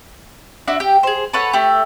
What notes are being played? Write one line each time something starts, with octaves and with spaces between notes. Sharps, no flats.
D4 E4 F#4
G4 G5
G#4 C5
A4 B4 C#5 F#5
A3 G4